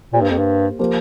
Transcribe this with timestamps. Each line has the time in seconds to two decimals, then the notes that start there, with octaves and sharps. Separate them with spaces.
0.13 A#2 A#3 G4 C5
0.21 G2
0.30 F2
0.38 G2
0.79 F3 A#3 G4 C5